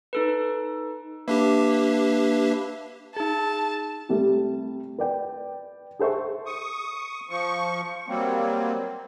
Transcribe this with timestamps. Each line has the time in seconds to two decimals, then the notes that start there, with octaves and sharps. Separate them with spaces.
0.13 D#4 A4 B4
1.28 A#3 D4 G4 B4 E5
3.16 D#4 G#4 A5
4.09 C3 G3 A3
4.99 B4 D5 G5
5.99 G#4 A4 C5 E5 C#6
6.46 C#6 D#6
7.29 F3 C#6
8.08 F#3 G3 A#3 C4